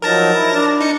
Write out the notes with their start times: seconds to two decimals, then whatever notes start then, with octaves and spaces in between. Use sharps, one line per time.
0.02 F3 F#3 D#4 A#4 A5 A#6
0.35 E4
0.52 D4
0.81 D#4 C#7